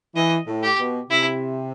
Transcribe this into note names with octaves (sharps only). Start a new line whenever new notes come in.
E3 D#5
A2
G4
B2
C3 E4